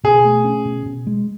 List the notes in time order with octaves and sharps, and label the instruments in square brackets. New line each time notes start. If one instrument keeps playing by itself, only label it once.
[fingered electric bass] B2 [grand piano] G#4
[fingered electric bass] A3
C#4
B2
B2
G#3